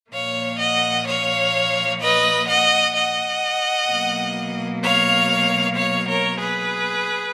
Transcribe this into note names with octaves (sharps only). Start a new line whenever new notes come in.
A#2 F3 A#3 C#5 F5
D#5 F#5
C#5 F5
B4 D#5
D#5 F#5
D#5 F#5
B2 F#3 A#3
C#5 F5
C#5 F5
A#4 C#5
G#4 B4